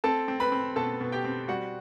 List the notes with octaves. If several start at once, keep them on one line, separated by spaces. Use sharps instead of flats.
C4 A4 A5
C4
B4 B5
C4
B2 A4 A5
B2
G4 G5
C4
G3 F#4 F#5